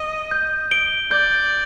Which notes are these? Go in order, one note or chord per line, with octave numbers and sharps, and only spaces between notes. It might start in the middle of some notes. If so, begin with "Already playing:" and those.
Already playing: D#5
G6
D7 G7
D5 G6